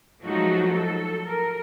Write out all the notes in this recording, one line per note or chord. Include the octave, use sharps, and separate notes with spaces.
F3 F#3 G#3 A3 D#4 F#4
A4
A#4